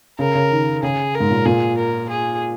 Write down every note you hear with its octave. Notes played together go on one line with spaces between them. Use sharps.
C#3 A#4
C#3
D#3
C#3 G#4
A#4
G#2
A#2
A#2 G#4
A#4
G#4